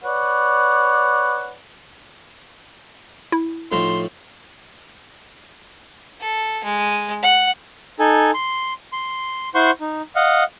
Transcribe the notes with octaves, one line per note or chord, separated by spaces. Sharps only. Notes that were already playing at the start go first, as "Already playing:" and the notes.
B4 C#5 D5 F#5
E4
A2 F3 D#4 C6
A4
G#3
F#5
D#4 A4 G#5
C6
C6
E4 C5 F#5 C6 C#6
D#4
D#5 F5 F#5